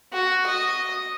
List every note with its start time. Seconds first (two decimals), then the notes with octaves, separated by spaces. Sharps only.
0.13 F#4
0.46 D#5